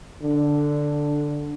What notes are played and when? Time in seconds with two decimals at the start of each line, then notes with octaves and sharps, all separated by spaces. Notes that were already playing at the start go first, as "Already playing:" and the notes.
0.22 D3